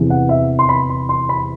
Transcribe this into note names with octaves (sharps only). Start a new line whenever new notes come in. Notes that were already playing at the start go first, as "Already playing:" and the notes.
Already playing: E2 C3 E3
F#5
E5
C6
B5
C6
C6
B5